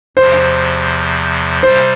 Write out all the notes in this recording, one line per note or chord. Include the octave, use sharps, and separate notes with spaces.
E2 C3 F3 C5
C3 G3 C5